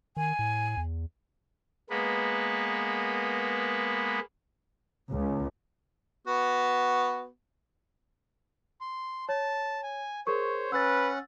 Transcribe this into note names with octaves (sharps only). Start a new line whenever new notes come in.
D#3 G#5
A2
E2
G#3 A#3 B3 B4
C#2
B3 F#4
C6
C#5 A5
G#5
G#4 A#4 C5 C#5 C#6
C#4 B4 F#5 E6 A6